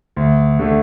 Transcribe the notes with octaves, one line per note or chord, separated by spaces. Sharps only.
D2
D3 A3